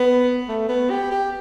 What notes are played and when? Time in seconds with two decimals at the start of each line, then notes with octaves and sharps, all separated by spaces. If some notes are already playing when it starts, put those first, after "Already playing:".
Already playing: B3
0.48 A3
0.69 B3
0.90 G4
1.11 G4